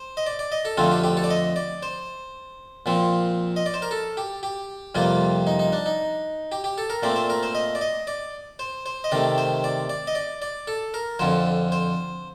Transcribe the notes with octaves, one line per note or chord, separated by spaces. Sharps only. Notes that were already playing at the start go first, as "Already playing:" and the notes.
Already playing: C5
D#5
D5
D5
D#5
A4
F2 D3 A3 C4 F4
G4
G4
A4
D5
D#5
D5
C5
A#2 F3 C4
D#5
D5
C5
A#4
A4
G4
G4
F2 C3 G3 A#3 F4
D#4
D#4
D4
D#4
G4
G4
A4
A#4
A#2 A3 C4 D5
C5
A#4
C5
D#5
D5
D#5
D5
C5
C5
D#5
C3 D#3 A3 D5
C5
D5
D5
D#5
D5
D5
A4
A#4
F2 D3 F3 C5
C5